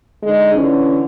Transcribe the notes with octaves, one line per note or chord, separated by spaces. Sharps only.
D3 G#3 D#4
D3 E3 C#4